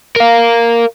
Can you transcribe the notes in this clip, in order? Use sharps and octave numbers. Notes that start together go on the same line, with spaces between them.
A#4 F5